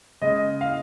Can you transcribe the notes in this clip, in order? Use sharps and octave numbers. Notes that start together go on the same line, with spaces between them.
C#3 G#3 D#5
F5